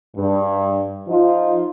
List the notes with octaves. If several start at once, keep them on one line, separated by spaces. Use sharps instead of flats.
G2
F3 D#4 F4